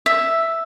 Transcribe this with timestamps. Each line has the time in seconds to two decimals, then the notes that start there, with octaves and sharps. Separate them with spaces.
0.06 E5